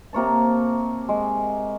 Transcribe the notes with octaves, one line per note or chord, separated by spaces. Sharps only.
C3 A#3 C#5 A5
G#3